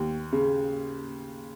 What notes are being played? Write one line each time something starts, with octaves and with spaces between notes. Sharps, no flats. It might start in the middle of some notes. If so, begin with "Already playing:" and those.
Already playing: D#2
C#3